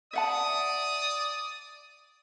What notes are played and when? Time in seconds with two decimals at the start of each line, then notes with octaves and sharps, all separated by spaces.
0.13 D5 E5 F#5 A5 D#6